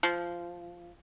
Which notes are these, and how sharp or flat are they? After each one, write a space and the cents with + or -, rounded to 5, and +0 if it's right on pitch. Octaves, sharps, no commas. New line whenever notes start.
F3 -10